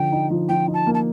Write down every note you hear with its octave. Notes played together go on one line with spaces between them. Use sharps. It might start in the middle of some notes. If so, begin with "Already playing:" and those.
Already playing: D3 F3 G5
D#4
F3
F3 G5
D#4
A5
A#3
A5